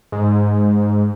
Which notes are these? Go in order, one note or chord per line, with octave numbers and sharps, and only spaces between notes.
G#2